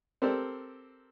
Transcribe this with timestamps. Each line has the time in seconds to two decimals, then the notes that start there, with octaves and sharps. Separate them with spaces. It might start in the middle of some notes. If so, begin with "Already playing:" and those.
0.22 C4 G4 A4 A#4 C5 D5